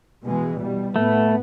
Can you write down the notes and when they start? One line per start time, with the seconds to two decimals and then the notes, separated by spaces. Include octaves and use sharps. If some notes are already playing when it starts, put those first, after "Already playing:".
0.23 B2 E3 G#3
0.58 B2 G3
0.96 A2 A3 B3